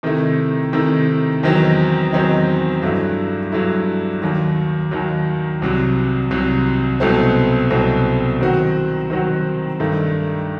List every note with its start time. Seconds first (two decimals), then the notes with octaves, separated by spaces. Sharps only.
0.03 C3 D#3 A3 E4
0.73 C3 D#3 A3 E4
1.43 E2 D#3 F#3 C4 D#4
2.13 E2 D#3 F#3 C4 D#4
2.82 G2 F#3 A3 E4
3.52 G2 F#3 A3 E4
4.22 D#2 D#3 F#3
4.91 D#2 D#3 F#3
5.62 C2 C3 F#3
6.31 C2 C3 F#3
7.00 C2 B2 F#3 A3 C4
7.70 C2 B2 F#3 A3 C4
8.41 D#3 F#3 C4 F#4
9.10 D#3 F#3 C4 F#4
9.80 G2 D#3 A3